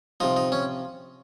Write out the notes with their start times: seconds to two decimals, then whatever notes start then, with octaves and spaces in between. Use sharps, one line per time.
0.20 C3 F3 D#4
0.36 D#4
0.52 C#4